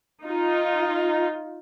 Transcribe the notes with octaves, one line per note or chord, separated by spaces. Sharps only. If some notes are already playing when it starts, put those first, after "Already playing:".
D#4 F4